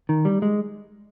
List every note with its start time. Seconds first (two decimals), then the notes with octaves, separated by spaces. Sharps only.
0.09 D#3
0.25 G3
0.42 G#3